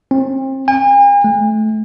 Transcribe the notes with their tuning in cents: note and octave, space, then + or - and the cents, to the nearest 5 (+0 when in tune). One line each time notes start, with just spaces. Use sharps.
C4 +35
G#5 -45
A3 -25